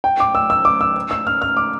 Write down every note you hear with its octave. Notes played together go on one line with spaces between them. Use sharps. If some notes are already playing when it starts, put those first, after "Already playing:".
G5
D6
E6
E6
D6
E6
E6
F6
F6
D6